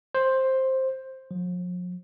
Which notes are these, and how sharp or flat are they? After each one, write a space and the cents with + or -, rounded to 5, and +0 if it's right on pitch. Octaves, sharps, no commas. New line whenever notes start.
C5 +10
F3 +45